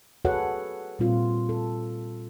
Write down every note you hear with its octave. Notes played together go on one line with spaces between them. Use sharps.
F#4 G#4 A4 B4 C#5 F#5
A#2 G3 C4 F4
A4